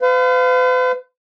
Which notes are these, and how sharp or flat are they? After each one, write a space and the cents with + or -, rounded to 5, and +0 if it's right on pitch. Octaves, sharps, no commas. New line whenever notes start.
B4 +45 F5 +0